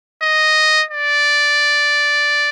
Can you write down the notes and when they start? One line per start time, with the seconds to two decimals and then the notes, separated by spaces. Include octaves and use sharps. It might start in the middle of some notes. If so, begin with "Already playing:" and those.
0.23 D#5
0.91 D5